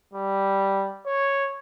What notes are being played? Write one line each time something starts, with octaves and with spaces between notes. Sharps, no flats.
G3
C#5